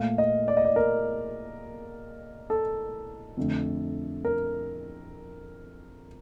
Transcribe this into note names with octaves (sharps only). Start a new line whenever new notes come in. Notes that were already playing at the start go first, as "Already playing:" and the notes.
Already playing: A#2 A3 F5
D#5
D5
D#5
D5
A#4
A4
F2 D3 A3
A#4